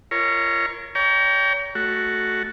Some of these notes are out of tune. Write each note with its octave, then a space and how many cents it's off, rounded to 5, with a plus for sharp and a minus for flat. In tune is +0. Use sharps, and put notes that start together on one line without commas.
F4 -40 A#4 +0 C#5 +5
C#5 +40 G5 +0 A#5 +10
A3 +0 F#4 +0